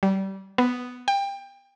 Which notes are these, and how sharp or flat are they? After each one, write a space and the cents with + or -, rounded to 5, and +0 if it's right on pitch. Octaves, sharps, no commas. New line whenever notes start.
G3 -25
B3 +5
G5 +20